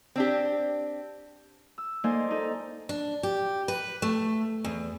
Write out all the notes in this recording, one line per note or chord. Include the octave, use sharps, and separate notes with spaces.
C4 D4 G4
E6
A#3 D#4 A4 C5 D5 G#5
D#4 A4
D4
G4
B4
A3
E2